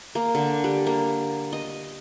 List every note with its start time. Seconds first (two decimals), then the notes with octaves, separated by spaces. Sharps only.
0.15 A#3
0.35 D3
0.64 G3
0.87 A#3
1.53 D#5